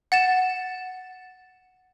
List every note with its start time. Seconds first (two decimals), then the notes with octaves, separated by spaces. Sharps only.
0.12 F#5 A6 E7